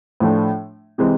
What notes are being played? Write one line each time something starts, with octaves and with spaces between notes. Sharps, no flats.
A2 F3 A3 D4
C3 E3 G#3 C4